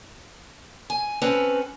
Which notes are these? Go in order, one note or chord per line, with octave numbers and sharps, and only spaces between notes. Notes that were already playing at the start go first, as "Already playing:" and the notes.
G#5
C4 C#4 A4 B4